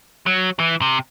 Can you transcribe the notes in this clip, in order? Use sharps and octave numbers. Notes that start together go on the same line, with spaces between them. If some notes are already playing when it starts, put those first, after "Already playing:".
F#3
E3
C3